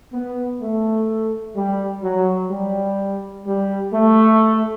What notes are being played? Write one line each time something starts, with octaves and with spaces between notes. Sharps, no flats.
B3
A3
G3
F#3
G3
G3
A3